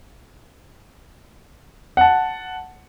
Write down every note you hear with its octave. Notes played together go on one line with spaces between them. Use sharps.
F#5 A5